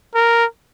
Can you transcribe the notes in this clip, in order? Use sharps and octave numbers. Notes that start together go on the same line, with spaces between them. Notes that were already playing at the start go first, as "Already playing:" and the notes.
A#4